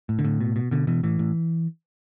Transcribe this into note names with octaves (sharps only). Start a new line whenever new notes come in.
A2
D3
A2
B2
B2
B2 D3
B2 E3
A2 E3
A2